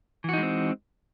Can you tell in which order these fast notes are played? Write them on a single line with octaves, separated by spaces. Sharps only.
E3 F#4 D#4 G#3 C4